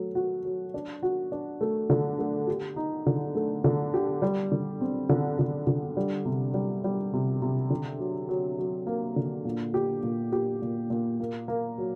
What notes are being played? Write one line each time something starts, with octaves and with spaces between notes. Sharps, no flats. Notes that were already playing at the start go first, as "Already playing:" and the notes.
Already playing: F#3 A3
F#4
F#3
D4
F#4
D4
A3
D3
A3
G4
D#4
D3
A3
D3
G4
G3
D3
C4
D3
D3
D3
G3
C3
G3
G3
C3
C3
D3
F#3
F#3
F#3
A#3
D3
A#2
G4
A#2
G4
A#2
A#2
A#3
A#3
F#3